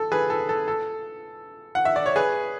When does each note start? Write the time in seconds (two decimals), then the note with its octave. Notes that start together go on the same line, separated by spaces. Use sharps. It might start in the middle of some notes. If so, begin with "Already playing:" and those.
Already playing: A4
0.12 G#4 B4
0.30 A4
0.49 A4
0.68 A4
1.75 F#5
1.85 E5
1.96 D5
2.06 C#5
2.16 G#4 B4